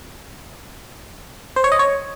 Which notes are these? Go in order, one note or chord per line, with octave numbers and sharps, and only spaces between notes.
C5
C#5
D#5
C#5